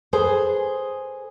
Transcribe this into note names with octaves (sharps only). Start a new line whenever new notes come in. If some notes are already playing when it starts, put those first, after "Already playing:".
G#4 A4 B4 C5 D5 G#5